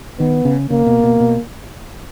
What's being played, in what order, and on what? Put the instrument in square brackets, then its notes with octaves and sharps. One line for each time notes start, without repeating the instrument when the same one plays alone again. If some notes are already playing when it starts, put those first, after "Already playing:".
[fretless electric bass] D#3 [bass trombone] B3
[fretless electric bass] C#3
[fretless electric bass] C#3 [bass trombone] A#3
[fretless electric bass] B2
B2
B2